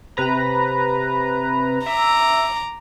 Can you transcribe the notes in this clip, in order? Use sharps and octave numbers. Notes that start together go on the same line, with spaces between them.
C3 B4 A#5
E5 A#5 D6